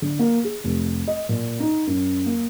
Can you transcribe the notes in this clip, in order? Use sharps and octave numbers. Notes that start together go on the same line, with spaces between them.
D3
A#3
G#4
F1
D#5
A#2
D#4
F#2
A#3